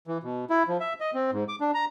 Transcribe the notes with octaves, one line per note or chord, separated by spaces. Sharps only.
E3
B2
E4
F3
E5
D#5
C4
G#2
D6
D4
A#5